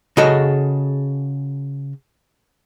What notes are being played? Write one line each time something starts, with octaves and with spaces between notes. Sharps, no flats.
C#3 F#4 G#4 A4 D#5